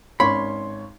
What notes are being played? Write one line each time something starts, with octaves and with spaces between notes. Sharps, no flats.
G#1 C#4 C#5 B5 C6